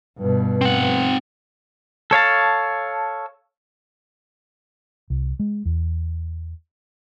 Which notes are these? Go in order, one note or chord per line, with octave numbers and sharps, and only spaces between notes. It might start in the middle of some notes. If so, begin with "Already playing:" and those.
G2 B2
C4 F#5
A4 C#5 F5 A5
C2
G#3
E2